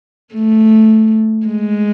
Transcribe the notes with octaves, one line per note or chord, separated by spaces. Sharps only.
A3
G#3